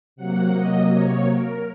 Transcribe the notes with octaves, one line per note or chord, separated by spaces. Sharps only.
C3 F#3 A#3 F#5
D#5
C#5
A#4